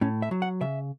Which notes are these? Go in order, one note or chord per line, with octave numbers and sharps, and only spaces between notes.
A2 C#4
E5
F#3
F#5
C#3 E5